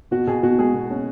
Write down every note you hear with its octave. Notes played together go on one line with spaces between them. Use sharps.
B2 F#4
B2 G#4
B2 F#4
G#3 G#4
B2
C#4